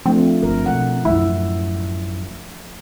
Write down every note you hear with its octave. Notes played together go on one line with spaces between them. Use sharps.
F3 A3 C4 D4
G1 A#4
B2 F#5
A1 F#2 E4 E5